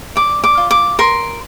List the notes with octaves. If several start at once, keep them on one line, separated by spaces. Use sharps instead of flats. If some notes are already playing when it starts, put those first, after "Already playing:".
D5 D6
D6
F4
D6
A#4 C6